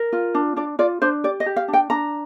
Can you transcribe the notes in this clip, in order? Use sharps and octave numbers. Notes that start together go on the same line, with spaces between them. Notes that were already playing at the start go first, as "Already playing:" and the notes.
Already playing: A#4
F4
D4
D4 D5
F4 D5
D4 C5
G4 D5
D#5
G4
F5
D4
G5
D4 A#5